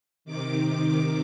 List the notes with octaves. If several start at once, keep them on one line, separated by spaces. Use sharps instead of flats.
C3 D#3 D6
D6